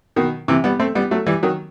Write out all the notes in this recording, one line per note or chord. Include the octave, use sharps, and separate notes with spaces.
B2 D#3
C3 E3
G3 B3
A3 C4
G3 B3
F#3 A3
E3 G3
D#3 F#3